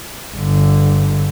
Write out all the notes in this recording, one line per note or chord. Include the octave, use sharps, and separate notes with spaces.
G1 D3